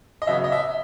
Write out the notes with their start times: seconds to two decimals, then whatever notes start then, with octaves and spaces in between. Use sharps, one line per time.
0.22 D#5
0.27 C#3 F#3 B3 E5
0.44 D#5
0.52 E5